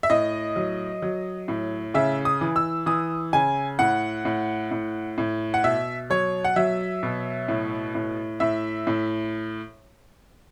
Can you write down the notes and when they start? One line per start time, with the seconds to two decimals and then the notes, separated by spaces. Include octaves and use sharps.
0.03 E5
0.10 A2 D#5
0.56 F#3
1.02 F#3
1.48 A2
1.94 C#3 E5
2.25 D#6
2.41 E3
2.56 E6
2.86 E3 D#6
3.33 C#3 G#5
3.79 A2 F#5
4.25 A2
4.71 A2
5.18 A2
5.54 F#5
5.63 B2 E5
6.10 F#3 C#5
6.44 F#5
6.56 F#3 E5
7.03 B2
7.48 A2
7.95 A2
8.40 A2 E5
8.87 A2